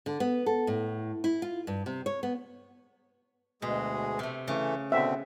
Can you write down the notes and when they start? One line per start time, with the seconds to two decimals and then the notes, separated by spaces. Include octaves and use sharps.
0.06 D3
0.20 B3
0.46 A4
0.67 A2
1.24 E4
1.42 F4
1.67 G2
1.86 C3
2.06 C#5
2.23 B3
3.62 D2 B2 G#3 G#4
4.19 C3 A3
4.48 C#3 E3 A3
4.92 B2 D3 C4 E5